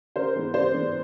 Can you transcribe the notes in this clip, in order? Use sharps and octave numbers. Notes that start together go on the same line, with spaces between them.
C#3 A#4 C5
E3 G#3 B3
C#3 C5 D5
E3 G#3 B3